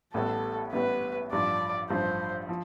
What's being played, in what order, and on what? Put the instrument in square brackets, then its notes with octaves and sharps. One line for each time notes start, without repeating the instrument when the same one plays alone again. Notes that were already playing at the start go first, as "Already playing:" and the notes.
[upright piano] A1 A2 G3 B3 [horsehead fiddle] A4
[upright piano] A1 A2 G3 B3 [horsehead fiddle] B4
[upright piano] A1 G2 F3 [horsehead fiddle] D5
[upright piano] A1 G2 F3 [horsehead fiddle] C5
[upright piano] F3